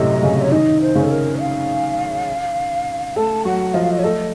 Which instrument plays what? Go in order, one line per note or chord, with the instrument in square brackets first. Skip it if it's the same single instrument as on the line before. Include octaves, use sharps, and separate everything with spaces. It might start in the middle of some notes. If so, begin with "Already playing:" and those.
Already playing: [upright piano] F#2 A2 C3 A3 C4 [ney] D#5
[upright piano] C#3 C#4
[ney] C#5
[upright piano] D#3 D#4 [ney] D#5
[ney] C5
[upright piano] C#3 C#4
[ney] A4
A#4
F5
[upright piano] A3 A4 [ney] A5
[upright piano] F#3 F#4 [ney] F#5
[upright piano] F3 F4 [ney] D#5
[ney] F5
D#5
C#5
[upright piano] A3 A4 [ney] D#5